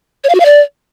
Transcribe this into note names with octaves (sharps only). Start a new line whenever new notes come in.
C#5
F5
F#4
F5
D5